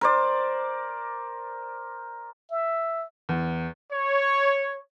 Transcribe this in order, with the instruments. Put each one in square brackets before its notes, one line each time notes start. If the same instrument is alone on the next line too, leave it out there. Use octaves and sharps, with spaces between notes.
[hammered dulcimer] A#4 C5 D5
[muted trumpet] E5
[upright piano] E2
[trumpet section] C#5